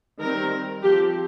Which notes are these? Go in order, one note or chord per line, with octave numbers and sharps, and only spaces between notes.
D#3 G3 C4 A#4
F3 C4 G4